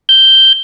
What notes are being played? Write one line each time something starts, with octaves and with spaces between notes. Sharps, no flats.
G6